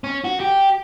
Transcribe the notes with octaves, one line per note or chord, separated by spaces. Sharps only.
C#4
F#4
G4